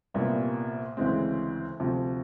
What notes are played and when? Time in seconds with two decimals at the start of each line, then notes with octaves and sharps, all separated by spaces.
0.14 C2 A#2 G3 B3
0.97 D2 C#3 E3 G#3 C4
1.80 D2 C3 F3